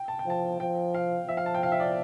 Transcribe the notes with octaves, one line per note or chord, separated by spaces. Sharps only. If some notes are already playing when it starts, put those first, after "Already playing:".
Already playing: G5
A5
G5
F3 A5
F3 G5
F5
F3 E5
F5
A5
G5
F5
E5
D5